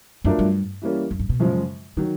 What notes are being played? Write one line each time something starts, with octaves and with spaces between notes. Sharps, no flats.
F#2 F#3 A3 D4 F4 A#4
G2
E3 G3 A#3 C#4
F#2
G2
B2
F#2 C#3 F3 G#3
D3 D#3 F#3